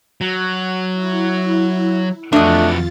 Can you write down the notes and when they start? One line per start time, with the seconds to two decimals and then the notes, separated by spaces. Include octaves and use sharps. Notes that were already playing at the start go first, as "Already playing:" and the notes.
0.21 F#3
0.94 E4
2.33 F2 E3 A3 D4 F4 F#4 D#5 A6